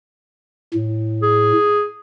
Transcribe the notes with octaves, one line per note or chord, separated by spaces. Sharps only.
A2
G#4